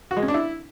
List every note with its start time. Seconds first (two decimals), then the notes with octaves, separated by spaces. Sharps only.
0.11 F#4
0.17 G#3
0.22 C#4
0.28 D4
0.34 E4